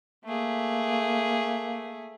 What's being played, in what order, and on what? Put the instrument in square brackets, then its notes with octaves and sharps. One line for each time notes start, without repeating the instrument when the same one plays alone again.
[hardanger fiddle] A3 G#4 [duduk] A#3